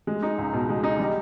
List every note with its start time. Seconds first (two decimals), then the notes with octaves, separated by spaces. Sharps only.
0.07 G#3
0.22 D#4
0.38 C#2
0.53 B2
0.69 G#3
0.83 D#4
0.99 G3